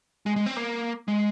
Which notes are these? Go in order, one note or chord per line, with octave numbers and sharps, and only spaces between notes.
G#3
G#3
C4
A#3
G#3